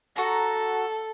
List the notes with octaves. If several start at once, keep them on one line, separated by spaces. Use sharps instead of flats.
F#4 A4 A#5